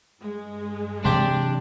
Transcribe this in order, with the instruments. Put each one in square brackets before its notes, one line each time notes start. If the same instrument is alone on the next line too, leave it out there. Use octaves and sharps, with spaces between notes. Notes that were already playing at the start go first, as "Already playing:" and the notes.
[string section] G2 G#3
[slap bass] C3 E3 F#3 [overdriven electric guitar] D4 [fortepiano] G4 C6